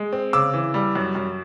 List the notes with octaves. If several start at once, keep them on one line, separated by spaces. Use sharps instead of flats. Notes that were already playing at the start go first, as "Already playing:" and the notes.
Already playing: G#3
C4
C#3 D6 E6
E3
G3
F#2
F#2